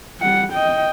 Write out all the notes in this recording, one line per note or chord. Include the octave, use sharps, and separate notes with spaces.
G3 F#5
D#5 G5